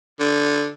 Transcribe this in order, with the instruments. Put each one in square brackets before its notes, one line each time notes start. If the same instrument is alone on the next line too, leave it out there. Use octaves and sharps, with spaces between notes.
[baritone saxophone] D3